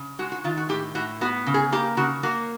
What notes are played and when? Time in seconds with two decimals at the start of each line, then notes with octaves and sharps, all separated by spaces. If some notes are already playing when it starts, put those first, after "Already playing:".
Already playing: C#3
0.19 G#3 F#4
0.32 F#4
0.44 D#3 F4
0.57 F#4
0.69 A2 G4
0.95 A2 F#4
1.21 B3 F#4
1.46 C#3
1.54 G#4
1.72 A#3 G4
1.97 C#3 F#4
2.23 A#3 F#4